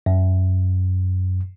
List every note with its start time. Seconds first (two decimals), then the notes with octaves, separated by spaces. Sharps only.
0.06 F#2